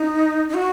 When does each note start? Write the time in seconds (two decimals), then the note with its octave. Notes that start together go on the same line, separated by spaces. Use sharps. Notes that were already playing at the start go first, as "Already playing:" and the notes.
Already playing: D#4
0.49 D#4
0.54 F#4